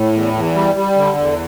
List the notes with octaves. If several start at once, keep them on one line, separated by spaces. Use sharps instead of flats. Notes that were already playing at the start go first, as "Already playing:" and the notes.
Already playing: A2
E2
E2
G3
G3
D3
E2